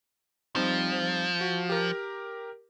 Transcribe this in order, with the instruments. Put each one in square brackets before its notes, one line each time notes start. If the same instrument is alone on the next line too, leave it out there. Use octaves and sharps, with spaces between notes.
[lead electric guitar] F3 [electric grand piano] G3 C4 D#4
[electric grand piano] F#4
G4 A#4